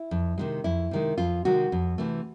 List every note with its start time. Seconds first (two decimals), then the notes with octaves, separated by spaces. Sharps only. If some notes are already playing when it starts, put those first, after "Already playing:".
Already playing: E4
0.11 F2
0.38 C3 D#3 G#3
0.64 F2 E4
0.91 C3 D#3 G#3
1.18 F2 F4
1.45 C3 D#3 G#3 F#4
1.72 F2
1.98 C3 E3 A3